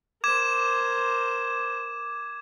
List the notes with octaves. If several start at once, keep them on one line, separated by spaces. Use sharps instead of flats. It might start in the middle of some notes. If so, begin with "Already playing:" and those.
A#4 C5 D6 G#6 E7